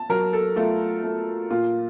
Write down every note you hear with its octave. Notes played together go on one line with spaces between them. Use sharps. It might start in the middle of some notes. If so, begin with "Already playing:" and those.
Already playing: A5
F#3 A#4
A4
A3 F4
A3
A#2 F4